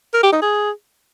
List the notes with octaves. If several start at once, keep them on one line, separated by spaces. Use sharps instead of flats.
A#4
G4
D#4
G#4